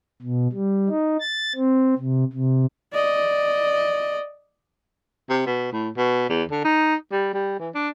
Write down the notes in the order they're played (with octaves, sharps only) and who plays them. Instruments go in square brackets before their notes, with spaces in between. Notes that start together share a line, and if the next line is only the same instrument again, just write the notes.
[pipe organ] B2
G3
D#4
A6
C4
C3
C3
[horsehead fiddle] D5 D#5
[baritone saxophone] C3
B2
A2
B2
E2
D3
D#4
G3
G3
E3
D4